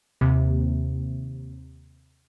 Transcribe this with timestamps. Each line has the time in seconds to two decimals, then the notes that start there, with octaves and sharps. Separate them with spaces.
0.21 D#2 C3